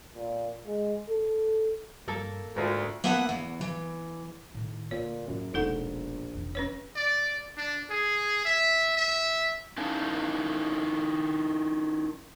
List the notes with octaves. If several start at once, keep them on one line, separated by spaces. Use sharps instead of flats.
A#2
G#3
A4
G2 A#3 A4
D2 G#2 F4 A#4 D5
A#3 B3 E5 F#5 A5
E2
E3
A2 D#3
D2 A#2 C#5
F#2 A2 C#3
E1 A#1 D#4 F4 A4 F#5
F1 E3
C#4 B4 C#5
D5
D4
G#4
E5
E5
C#4 D#4 E4 A#4 F5 A5